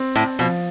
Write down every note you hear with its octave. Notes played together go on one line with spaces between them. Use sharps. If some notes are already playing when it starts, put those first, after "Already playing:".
Already playing: C4
A2
B2 F3